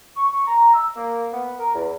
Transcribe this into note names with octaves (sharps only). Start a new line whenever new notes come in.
C#6
A#5
E6
A#3
B3
A#4
E2